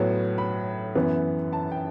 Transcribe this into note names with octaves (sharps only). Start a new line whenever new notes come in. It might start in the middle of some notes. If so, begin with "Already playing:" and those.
Already playing: A2 F#3 B3
B5
F#2 E3 B3
A5
G5